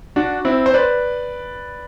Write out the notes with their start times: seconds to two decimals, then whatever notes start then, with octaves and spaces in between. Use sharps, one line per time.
0.16 D4 F#4
0.45 C4 E4
0.66 C5
0.74 B4 D5